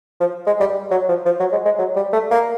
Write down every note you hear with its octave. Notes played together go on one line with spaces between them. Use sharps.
F3
G#3
G3
F#3
F3
F3
F#3
G#3
G#3
F#3
G3
A3
A#3